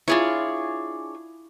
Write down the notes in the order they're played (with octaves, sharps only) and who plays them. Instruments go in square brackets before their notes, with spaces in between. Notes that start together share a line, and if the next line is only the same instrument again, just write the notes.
[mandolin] D4 G#4 C#5 [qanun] E4 F4